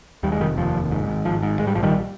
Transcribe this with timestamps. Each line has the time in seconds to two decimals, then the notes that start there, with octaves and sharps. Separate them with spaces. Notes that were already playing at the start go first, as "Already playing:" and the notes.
0.23 D#2 G3
0.32 G#3
0.40 F1 D#3 G3
0.57 D#2 F3
0.75 F1
0.91 G#2
1.08 G#1
1.25 G#1 F3
1.43 G#2
1.59 G#2 G#3
1.67 G3
1.75 A#1 F3
1.83 D#3 G3